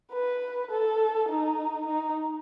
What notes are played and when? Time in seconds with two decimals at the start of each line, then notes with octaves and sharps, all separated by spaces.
0.13 B4
0.71 A4
1.29 D#4
1.87 D#4